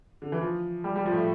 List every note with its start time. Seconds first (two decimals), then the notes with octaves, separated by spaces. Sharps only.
0.22 D3
0.32 E3
0.41 F3
0.84 G3
0.96 G3
1.06 F3
1.12 A2